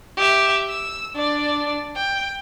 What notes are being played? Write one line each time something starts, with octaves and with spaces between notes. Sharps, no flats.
G4 E5
E6
D4 D5
G5